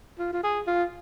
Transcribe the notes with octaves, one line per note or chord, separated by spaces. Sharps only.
F4
F4
G#4
F4